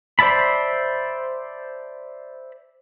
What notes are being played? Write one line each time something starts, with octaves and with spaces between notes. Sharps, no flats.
C5 D5 E5 A5 B5